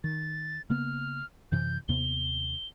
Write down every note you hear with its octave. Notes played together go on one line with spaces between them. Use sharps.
D#3 A6
C#3 A#3 B3 F6
F#2 C3 E3 G6
D#2 C3 B3 G7